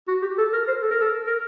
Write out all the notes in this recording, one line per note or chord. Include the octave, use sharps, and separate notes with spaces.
F#4
G4
A4
A#4
C5
A4
A#4
A4
A#4